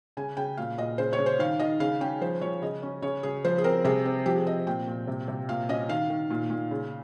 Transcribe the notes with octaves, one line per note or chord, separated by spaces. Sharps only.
C#3 G#5
C#3 G5
A#2 F5
A#2 D#5
C#3 C5
C#5
C#3
C5
D#3 F5
D#3 D#5
C#3 F5
C#4 G5
F3 C5
F3 C#5
C#3 D#5
C#4 C#5
C#3 C#5
C#3 G#4
F3 C5
G#4
C4 A#4
C3 G#4
C4
F3 G4
G#4
C4 D#5
A#2 G5
A#2
C3
C3
A#2 F5
C#4 D#5
D#3 F5
D#3
A#2
A#2
C#3